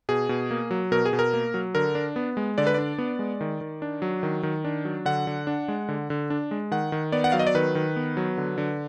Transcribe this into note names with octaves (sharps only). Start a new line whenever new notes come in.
B2 G#4
B2
A#3
F#3
B2 A#4
G#4
B2
A#4
A#3
F#3
D3 A#4
D4
B3
G#3
D3 D5
B4
D4 D5
B3
G#3
D#3
D#3
D4
F#3
D#3
D#3
D4
F#3
D3 F#5
D3
D4
G#3
D3
D3
D4
G#3
D#3 F#5
D#3
B3 D5
F#5
F#3 F5
D#5
D5
D#3 B4
D#3
B3
F#3
D3
D3